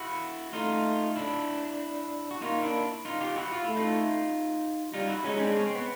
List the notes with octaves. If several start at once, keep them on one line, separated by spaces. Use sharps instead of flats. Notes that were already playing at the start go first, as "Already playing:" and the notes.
Already playing: E4 F#4
A3 D#4 F4
D4 E4
F#4
A#3 D#4 F4
D4 E4
D#4 F4
F4 G4
E4 F#4
F4
A3 E4
D#4 F4
G3 D#4 F4
E4 F#4
G#3 C#4 D#4
C4 D4
C#4
C4
B3